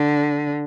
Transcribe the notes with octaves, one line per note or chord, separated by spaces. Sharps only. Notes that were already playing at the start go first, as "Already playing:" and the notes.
Already playing: D3